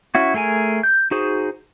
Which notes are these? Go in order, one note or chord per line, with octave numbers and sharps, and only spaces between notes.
C#4 E4 F#4
A3 G#4 A#4 G#5
G6
D#4 F#4 G#4 C5